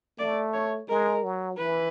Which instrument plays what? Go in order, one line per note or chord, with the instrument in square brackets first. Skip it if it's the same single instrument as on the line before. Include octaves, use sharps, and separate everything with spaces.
[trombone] A3 [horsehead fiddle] D5
[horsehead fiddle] C#5
[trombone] G#3 [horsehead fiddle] A#4
[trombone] F#3
[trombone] E3 [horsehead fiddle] B4